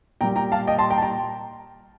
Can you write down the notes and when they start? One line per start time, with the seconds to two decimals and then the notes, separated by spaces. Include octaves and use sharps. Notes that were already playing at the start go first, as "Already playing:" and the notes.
0.21 A#2 G3 G5 A#5
0.36 G5 A#5
0.52 F5 A5
0.67 D#5 G5
0.79 A5 C6
0.90 G5 A#5
0.98 A5
1.02 G5 A#5